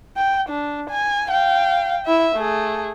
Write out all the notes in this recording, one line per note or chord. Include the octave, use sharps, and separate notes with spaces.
G5
D4
G#5
F5 G5
E4 E5
A3 G#4